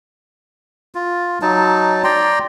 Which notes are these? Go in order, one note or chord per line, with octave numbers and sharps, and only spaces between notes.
F4
F#3 D#4 A5
D5 G5 A#5 C6